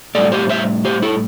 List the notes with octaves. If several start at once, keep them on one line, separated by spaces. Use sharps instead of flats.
A2 G3 A4 D5
G4 C5
C5 E5
G4 C5
E4 A4